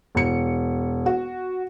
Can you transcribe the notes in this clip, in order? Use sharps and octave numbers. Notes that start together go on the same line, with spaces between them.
E1 C#7
F#4